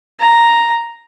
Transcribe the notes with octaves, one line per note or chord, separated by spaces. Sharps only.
A#5